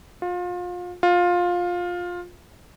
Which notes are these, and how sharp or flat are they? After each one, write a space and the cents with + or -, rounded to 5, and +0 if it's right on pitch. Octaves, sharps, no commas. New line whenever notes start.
F4 +30
F4 +15